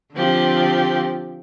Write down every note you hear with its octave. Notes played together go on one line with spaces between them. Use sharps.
D3 F3 C4 G4